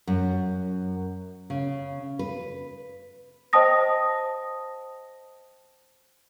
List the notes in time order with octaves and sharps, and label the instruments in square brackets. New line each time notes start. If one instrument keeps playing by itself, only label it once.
[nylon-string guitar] F#2
C#3
B4
[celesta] C5 D#5 G5 A5 D#6 A#6